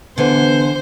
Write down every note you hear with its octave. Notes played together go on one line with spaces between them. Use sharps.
D3 E3 B3 C5